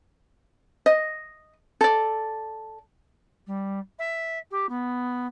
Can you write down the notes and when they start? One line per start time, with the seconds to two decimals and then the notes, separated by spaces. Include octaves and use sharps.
0.86 D#5
1.81 A4 D5
3.47 G3
3.99 E5
4.51 G4
4.69 B3